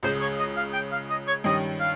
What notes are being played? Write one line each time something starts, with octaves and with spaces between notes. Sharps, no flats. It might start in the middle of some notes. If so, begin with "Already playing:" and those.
C#2 C#3 G#3 C5
C#5
D#5
F5
G5
F5
D#5
C#5
G2 D#3 G3 C#4 D#5
F5